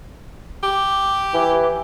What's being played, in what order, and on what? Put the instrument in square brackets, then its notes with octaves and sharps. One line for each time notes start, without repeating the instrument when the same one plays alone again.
[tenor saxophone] G4
[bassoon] E3